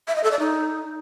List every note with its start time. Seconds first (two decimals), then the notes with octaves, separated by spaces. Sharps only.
0.08 E5
0.16 D#5
0.24 A4
0.31 D5
0.39 D#4